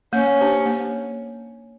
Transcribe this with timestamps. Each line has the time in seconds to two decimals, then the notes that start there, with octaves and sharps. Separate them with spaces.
0.13 A#3 C#4
0.39 D4 G4 C5
0.66 A#3